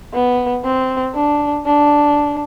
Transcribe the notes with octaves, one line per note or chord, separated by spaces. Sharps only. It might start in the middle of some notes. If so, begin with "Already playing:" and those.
B3
C4
D4
D4